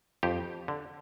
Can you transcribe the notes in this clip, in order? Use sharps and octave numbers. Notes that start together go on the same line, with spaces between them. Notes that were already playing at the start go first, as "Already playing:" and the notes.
F2 G4
D3